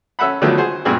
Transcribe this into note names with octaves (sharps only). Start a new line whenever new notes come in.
C#4 A4 E5 F#5 B5
D3 D#3 F3 F#3 A3 B3
G#4 C5 F#5
G2 A#2 B3 C4 G#4 E6